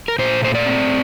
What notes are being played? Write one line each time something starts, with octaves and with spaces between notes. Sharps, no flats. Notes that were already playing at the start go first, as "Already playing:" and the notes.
A#4
A#2 C5
A3 C5
D5
C4